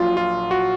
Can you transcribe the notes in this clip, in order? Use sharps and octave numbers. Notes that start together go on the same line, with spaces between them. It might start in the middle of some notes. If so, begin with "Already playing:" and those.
Already playing: A#1 A#2 F#3 F4
F4
F#4